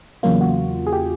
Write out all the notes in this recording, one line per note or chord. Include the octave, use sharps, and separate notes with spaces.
E2 C#3 F#3 A#3 F4
F#4
G#4
G4